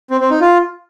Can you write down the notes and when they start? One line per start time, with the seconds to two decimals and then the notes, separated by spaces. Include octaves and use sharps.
0.10 C4
0.20 C4
0.30 D#4
0.40 F4